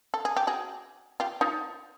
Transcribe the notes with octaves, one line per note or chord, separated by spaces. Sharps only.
A4
G#4
G4
F#4 G#4
F4 G4
D#4 F4